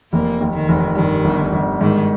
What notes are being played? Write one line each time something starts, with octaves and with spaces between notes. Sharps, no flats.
F1 A#3
D#2
D#3
F1
G2 D#3
G1
G1
G#2 D#3